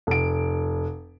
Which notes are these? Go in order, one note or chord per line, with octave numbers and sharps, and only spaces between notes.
F1 D7